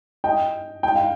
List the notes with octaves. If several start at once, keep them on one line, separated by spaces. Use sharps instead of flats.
D#5 G5
G5
F5